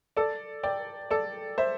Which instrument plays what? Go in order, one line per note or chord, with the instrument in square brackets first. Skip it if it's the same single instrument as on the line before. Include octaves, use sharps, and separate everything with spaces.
[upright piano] A4 D5
D5 G5
A4 D5
C5 E5